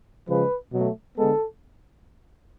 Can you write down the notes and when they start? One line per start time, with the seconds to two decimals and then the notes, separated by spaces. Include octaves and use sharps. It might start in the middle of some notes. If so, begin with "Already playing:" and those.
0.28 C#3 F3 G#3 B4
0.72 B2 F#3 A3
1.16 D3 G#3 B3 A4